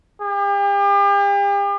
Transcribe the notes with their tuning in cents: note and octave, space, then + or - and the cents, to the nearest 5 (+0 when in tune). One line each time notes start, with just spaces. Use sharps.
G4 +40